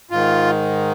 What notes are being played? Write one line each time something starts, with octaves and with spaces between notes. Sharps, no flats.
G#2 D#3 F4